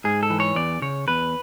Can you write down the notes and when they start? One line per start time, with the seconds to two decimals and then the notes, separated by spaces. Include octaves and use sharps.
0.04 G#2 G#4
0.23 A4
0.30 E3
0.40 C#5
0.56 E2 D5
0.82 C#3 C#5
1.08 E2 B4